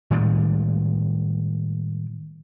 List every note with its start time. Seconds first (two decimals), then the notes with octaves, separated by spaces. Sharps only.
0.11 A2 D#3 G3 G#3